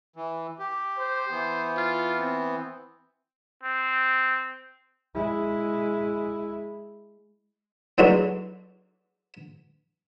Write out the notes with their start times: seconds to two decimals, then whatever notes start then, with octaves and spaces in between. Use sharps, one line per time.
0.16 E3
0.59 G4
0.98 C5
1.31 E3 B3
1.77 F4
2.20 C4
3.63 C4
5.15 G#3 E4
7.98 E3 F#3 G#3 A3 D4 E4